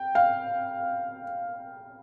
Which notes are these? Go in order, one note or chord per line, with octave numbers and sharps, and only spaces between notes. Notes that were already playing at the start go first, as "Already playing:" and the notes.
Already playing: G5
F5